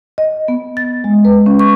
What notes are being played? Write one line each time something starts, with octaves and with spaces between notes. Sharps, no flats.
D#5
B3
A6
G#3
B4
C#4
C#6